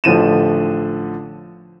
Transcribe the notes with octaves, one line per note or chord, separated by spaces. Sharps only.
A1 D3 F3 D#7 E7